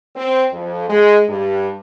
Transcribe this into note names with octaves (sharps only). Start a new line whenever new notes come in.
C4
F2
G#3
G2